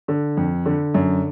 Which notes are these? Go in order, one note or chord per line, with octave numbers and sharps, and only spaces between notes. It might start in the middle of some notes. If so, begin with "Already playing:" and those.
D3
F2
D3
F#2